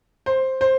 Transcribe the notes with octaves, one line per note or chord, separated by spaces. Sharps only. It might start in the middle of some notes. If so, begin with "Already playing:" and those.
C5
C5